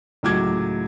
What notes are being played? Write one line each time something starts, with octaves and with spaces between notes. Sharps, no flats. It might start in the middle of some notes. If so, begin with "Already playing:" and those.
C#2 A2 F#3 D6 G#6